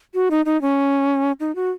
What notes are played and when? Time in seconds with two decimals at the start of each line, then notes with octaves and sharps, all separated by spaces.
0.15 F#4
0.31 D#4
0.46 D#4
0.62 C#4
1.40 D#4
1.56 F#4